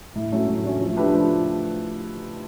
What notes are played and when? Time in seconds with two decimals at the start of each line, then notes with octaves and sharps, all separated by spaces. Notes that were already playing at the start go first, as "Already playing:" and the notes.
0.15 A2
0.32 F#3 A3 C#4
0.48 A2
0.64 F#3 A3 C#4
0.80 F3
0.96 A3 D4 G4 B4
1.13 F3